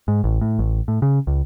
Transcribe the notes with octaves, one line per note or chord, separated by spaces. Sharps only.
G#2
A1
A2
A1
A2
C#3
C#2